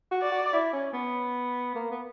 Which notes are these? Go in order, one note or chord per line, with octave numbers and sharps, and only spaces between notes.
F#4
D5
F#4
E4
C#4
B3
A#3
B3